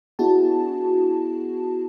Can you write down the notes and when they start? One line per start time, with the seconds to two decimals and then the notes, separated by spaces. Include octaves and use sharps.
0.19 B3 D4 E4 F#4 G#4 A5